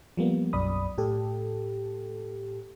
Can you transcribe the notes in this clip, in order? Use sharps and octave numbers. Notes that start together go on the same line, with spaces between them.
F3 G3 A#3 B3
B1 F#2 D5 B5 D#6
A2 G4 A4